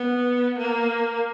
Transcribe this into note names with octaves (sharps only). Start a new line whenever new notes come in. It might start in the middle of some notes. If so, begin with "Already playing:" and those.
Already playing: B3
A#3